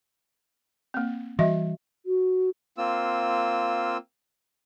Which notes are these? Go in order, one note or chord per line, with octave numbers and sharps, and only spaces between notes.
A#3 C4
E3 G3 F#4 D#5 E5
F#4
A#3 C4 F4 E6